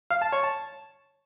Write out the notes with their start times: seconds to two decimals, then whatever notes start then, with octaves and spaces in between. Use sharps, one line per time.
0.10 F5
0.21 A5
0.32 C#5
0.43 A5